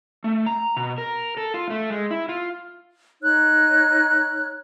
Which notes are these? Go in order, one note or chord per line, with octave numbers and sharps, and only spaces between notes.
A3
A#5
B2
A#4
A4
F4
A3
G#3
E4
F4
D#4 C#5 F6 F#6